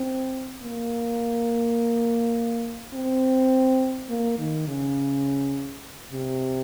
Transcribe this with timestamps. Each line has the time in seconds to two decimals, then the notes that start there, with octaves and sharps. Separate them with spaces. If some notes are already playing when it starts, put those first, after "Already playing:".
Already playing: C4
0.63 A#3
2.94 C4
4.10 A#3
4.38 D#3
4.68 C#3
6.12 C3